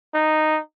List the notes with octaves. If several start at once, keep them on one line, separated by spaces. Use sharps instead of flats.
D#4